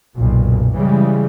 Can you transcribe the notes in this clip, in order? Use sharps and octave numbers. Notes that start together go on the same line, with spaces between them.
F#1 B1 A#2
C#3 E3 G3 G#3